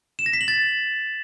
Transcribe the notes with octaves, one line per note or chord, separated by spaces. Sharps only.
E7
A#6
B6
F#7
A6